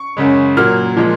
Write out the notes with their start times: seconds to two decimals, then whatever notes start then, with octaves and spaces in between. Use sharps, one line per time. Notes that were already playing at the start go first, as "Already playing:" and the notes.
Already playing: C#6
0.17 F#2 C#3 G#3
0.57 A#2 F#3 A#3 F6
0.97 A#2 F3 G#3